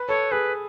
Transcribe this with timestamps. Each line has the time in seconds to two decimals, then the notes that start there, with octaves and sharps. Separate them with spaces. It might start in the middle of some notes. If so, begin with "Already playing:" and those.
Already playing: B4
0.08 A4 C#5
0.32 G#4 B4